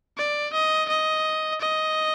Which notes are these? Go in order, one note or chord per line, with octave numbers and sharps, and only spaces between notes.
D5
D#5
D#5
D#5